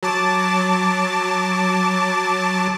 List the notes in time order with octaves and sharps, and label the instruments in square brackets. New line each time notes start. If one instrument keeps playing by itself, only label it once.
[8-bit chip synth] F#3 A5 D6